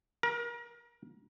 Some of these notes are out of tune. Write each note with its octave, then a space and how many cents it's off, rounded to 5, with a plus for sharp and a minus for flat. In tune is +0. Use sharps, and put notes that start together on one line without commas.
A#4 +30